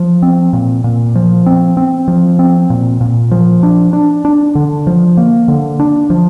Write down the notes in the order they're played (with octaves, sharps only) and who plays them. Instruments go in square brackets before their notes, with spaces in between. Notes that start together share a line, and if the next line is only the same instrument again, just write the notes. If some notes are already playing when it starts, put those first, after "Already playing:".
Already playing: [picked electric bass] F3
C4
A#2
A#2
F3
C4
C4
F3
C4
A#2
A#2
F3
D4
D4
D4
D3
F3
A#3
D3
D4
F3